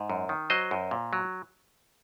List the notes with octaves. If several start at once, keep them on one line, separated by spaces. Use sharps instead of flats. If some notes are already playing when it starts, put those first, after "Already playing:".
Already playing: G#2
F#2
D#3
F#3 C5 D#5
F#2
A#2
F#3